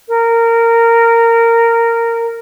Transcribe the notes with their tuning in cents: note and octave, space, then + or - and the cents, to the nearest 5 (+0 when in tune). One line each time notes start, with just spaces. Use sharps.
A#4 -15